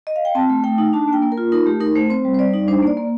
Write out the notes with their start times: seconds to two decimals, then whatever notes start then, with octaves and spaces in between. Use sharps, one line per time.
0.07 D#5
0.16 F5
0.25 G5
0.35 C4 A5
0.50 A3
0.64 A3 G5
0.78 D#4
0.93 D4 A5
1.08 A#3
1.13 G5
1.22 A#3
1.32 A#4
1.38 F4
1.52 D#4 A#4
1.66 A3 G4
1.80 D#4 A#4
1.95 A3 C5
2.10 C4 C5
2.25 G3
2.34 C5
2.39 G3 D5
2.53 D#4
2.68 D4 C5
2.82 A#3 D5
2.97 A#3